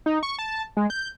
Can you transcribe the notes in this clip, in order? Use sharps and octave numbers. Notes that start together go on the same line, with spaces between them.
D#4
C#6
A5
G#3
G6